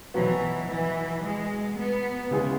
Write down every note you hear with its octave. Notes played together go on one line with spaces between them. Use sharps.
B2 E3 F#3 B3 F#4 B4
E3
G#3
B3
C#3 G#3 B3 E4 G#4